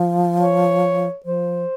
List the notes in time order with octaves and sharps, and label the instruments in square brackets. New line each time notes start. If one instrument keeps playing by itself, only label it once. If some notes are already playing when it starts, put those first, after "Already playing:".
Already playing: [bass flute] F3
[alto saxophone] C#5
[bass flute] F3 [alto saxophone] C5